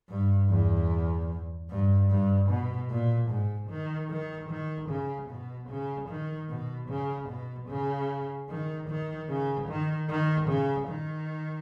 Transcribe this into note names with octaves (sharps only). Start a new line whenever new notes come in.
G2
E2
G2
G2
B2
A#2
G#2
D#3
D#3
D#3
C#3
B2
C#3
D#3
B2
C#3
B2
C#3
D#3
D#3
C#3
D#3
D#3
C#3
D#3